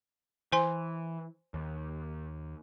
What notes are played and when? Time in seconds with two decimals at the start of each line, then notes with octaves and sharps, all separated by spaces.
0.52 E3 C5 G#5 C6
1.54 D#2